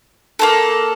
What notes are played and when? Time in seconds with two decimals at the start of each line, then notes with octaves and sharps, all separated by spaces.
0.39 A#3 C#4 A4